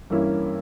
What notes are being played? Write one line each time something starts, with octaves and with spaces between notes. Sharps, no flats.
G2 E3 A#3 C#4 E4